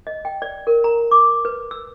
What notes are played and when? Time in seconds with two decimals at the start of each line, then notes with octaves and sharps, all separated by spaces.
0.07 D#5
0.25 G5
0.42 D5
0.67 A#4
0.84 A#5
1.11 D6
1.45 B4
1.71 E6